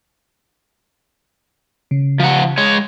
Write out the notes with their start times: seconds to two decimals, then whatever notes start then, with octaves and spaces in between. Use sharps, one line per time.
1.91 C#3
2.20 F3 F#5
2.58 G#3 C#5